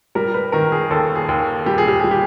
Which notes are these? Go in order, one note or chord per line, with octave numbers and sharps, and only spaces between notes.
G3 A#4
B4
D#3 A#4
G#4
D#2 A4
G#4
D#2
G3 G4
G#4
G4
G3 G#4
G4